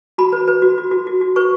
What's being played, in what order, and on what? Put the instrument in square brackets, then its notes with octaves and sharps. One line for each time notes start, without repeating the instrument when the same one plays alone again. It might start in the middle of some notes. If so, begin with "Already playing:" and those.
[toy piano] F#4 B5
B4
B4
F#4
F#4
F#4
F#4
F#4
B4 C#6